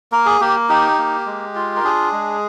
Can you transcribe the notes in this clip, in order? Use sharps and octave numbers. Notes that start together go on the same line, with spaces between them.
A#3 A#4
G#4
A#3 G4
D#4 G4
A#3
G#3
F4
A#4
D4 G#4
G#3